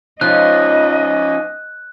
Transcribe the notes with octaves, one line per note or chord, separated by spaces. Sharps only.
F3 C#4 D#4 D#5 F#6